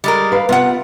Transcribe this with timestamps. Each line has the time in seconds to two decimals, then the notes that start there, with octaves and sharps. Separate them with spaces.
0.04 G3 G#3 A#4
0.32 B4 F5
0.49 C3 B3 F4 F#5